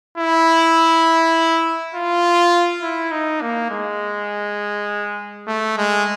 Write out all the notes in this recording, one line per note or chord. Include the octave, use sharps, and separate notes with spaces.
E4
F4
E4
D#4
A#3
G#3
A3
G#3